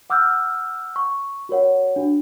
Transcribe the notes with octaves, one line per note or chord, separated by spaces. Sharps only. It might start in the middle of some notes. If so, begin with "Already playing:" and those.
F#5 D6 E6 F6 G6
C#6
F#4 A#4 C#5 F#5
D4 F#4